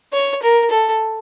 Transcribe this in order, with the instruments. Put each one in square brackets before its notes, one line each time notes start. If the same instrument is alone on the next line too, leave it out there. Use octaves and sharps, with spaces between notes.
[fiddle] C#5
A#4
A4